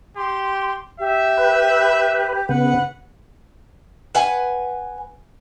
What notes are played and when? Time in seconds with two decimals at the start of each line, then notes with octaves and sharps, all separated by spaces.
0.17 G4 C6
1.00 G4 E5
1.38 B4
2.49 C#3 B3 B4 F#5
4.15 B4 F#5 G#5